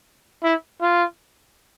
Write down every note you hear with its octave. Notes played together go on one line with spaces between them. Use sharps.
E4
F4